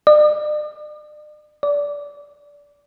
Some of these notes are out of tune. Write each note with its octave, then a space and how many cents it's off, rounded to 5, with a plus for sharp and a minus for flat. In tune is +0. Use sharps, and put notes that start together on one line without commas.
D5 +40
D5 -20